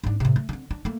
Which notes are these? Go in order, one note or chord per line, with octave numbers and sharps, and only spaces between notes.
G#2 D4
A2 C3
A3
D3 C4
D4
A3 A#3